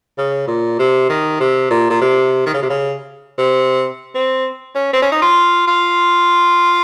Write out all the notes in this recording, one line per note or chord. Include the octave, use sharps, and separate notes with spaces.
C#3
A#2
C3
D#3
C3
A#2
A#2
C3
D#3
C#3
C3
C#3
C3
C4
C#4
C4
C#4
D#4
F4
F4